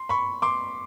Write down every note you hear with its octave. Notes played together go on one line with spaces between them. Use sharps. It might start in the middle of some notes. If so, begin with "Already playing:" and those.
Already playing: C6
B5 C#6
C6 D6